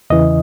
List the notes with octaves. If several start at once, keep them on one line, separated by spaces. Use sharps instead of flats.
E2 C#3 E3 D#5